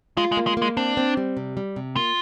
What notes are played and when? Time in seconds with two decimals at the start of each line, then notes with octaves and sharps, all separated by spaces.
0.17 G#3 F4
0.32 G#3
0.37 A#3
0.47 G#3
0.57 G#3 A#3
0.77 C4 D4
0.97 C4
1.17 G3
1.37 C3
1.57 G3
1.76 C3
1.96 A#3 F4